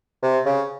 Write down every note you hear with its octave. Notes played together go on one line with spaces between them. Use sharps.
C3
C#3